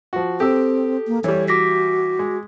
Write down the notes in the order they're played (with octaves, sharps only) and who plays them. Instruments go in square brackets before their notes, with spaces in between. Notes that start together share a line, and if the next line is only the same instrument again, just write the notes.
[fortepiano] F3 F#4
[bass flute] C4 [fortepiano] G4 E6 [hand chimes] A4
[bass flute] A#3
[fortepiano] E3 G3 [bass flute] C#5
[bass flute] F#4 [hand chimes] D6 A#6 B6
[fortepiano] G#3